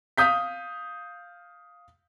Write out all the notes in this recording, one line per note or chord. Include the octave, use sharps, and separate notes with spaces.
F5 D#6 G6 B6